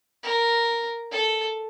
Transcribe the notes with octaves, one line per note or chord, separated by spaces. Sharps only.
A#4
A4